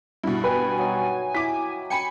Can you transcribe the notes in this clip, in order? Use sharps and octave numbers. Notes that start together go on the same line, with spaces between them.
G2 B2 E4
B4 G5 G#5
F#3 D#4
E4 D6 B6
G5 G#5 B5 C#7